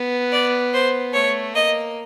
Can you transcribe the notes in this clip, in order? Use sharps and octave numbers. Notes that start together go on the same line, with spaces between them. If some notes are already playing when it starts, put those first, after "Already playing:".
Already playing: B3
D5
C5
A3 C#5
A#3 D#5